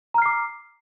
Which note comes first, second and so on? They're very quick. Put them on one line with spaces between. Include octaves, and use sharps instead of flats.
A#5 F6 C7 D6